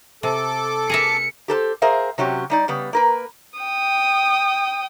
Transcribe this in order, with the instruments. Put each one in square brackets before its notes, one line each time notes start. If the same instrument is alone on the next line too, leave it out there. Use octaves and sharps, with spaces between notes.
[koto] C3 [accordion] A4 D6
[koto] G#4 A#4 E5 [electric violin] C#7
[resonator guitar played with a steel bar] G4 A4 B4 C5
G#4 A#4 C5 E5 F5
C3 F#3 C#4 G4
G3 D#4 D5
C#3 G3 B3
A#3 A#4 B4
[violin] G5 D#6